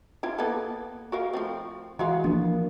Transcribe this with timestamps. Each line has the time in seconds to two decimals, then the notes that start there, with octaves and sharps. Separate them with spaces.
0.23 C4 E4 F4
0.38 A#3 B3 A4
1.12 F#4 A#4 F5
1.33 F3 A3 C4
1.99 E3 G#3 F#4 F5
2.24 F3 A#3 B3 D4